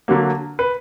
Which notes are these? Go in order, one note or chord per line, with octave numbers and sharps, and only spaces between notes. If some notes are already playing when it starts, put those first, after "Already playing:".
D3 F#3 A#3
B4